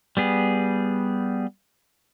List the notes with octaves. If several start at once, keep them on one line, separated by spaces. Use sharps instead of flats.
G3 B3 G#4